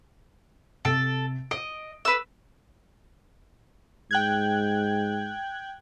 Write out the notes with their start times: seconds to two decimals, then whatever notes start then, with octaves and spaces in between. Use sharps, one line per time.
0.85 C3 A4 D7
1.51 D#5 D7
2.05 B4 E6
4.11 G#2 G5 F#6 G#6